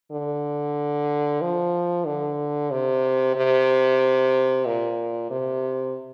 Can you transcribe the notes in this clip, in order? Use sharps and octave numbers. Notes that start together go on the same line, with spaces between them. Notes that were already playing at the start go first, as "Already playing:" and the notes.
D3
F3
D3
C3
C3
A#2
C3